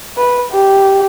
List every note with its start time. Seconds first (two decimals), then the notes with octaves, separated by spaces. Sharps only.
0.17 B4
0.52 G4